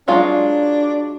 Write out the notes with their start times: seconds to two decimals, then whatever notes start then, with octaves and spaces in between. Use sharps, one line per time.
0.08 F#3 G#3 D4 F4